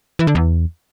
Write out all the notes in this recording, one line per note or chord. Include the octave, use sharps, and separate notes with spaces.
E3
D3
E2